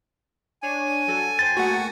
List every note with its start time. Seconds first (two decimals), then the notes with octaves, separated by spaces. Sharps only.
0.63 D4 C#5 G#5
1.07 F#3 F#4 A4
1.39 C5 G5 A6
1.57 A3 A#3 F#4 G#4 F#5